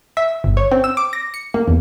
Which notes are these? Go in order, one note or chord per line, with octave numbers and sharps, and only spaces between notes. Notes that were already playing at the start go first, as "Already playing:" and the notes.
E5
G1
C#5
C4
E6
D6
A#6
C#7
A#3
E2